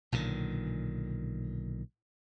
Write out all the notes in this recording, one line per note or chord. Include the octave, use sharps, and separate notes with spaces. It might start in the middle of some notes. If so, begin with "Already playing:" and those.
B1 A#2 D3 D#3